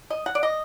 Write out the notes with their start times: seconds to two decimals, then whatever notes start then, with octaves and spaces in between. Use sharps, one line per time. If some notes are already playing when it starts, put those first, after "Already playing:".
0.10 D#5
0.26 F#5
0.35 D5
0.43 D#5